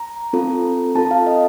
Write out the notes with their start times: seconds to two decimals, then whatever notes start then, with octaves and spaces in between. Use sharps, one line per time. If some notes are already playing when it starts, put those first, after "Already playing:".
Already playing: A#5
0.33 C4 F4 A4
0.95 C4 F4 A4 A5
1.11 F5
1.27 D#5